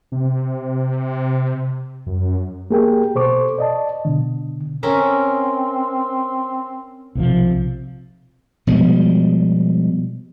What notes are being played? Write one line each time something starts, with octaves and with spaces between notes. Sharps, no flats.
C3
F#2
A#3 G4 G#4 A#4 G5
B2 A4 C5 C#6 D6
D5 D#5 A5
B2 D3
C4 C#4 A#4 E5
B1 C3 F3
B2 F3 G3 G#3